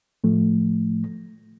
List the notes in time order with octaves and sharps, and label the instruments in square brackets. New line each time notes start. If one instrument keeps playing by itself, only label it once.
[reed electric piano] A2 F3 A3